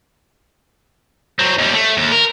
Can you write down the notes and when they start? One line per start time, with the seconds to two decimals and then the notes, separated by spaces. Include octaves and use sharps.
1.39 F#3 C4
1.58 D#2 G3
1.74 A3
1.97 D#2
2.12 A#4